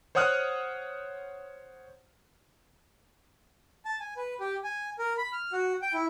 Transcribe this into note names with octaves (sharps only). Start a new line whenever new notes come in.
C5 C#5 F#5 D#6 F6 F#6
A5
G#5
B4
G4
G#5
A#4
B5
F6
F#4
G5
E4